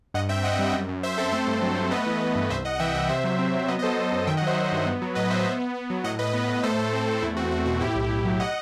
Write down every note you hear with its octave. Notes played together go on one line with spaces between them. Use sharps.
G2 D#5 F#5
C4 E5 G5
C4 D#5 F#5
G3
F#2
F#2
F#2 C5 E5
C4 A4 C5
A3 A4 C5
G2
F#3
A3
B3 B4 D#5
E3
B3
G2
C2 C5 E5
C2 D#5 F#5
F#5
E3 E5 G5
C2 D#5 F#5
C3 C5 E5
F#3
C4
F#3
B3 B4 D#5
D#5
F#3 A4 C5
B3
F#2
D#3 E5 G5
D#5 F#5
F#3 C5 E5
F#3
G2
B3
F#3
A2 B4 D#5
B3 C5 E5
B3
B3
B3
F#3
A2 D#5 F#5
A2 B4 D#5
B3
A2
A3 A4 C5
A3
C4
A3
E2 E4
C4 F#4
C4 F#4
B2 F#4
A2 E4 G4
B1
A2
F#3
D#5 F#5